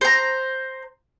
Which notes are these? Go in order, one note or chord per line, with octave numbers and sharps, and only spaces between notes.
C5 A#5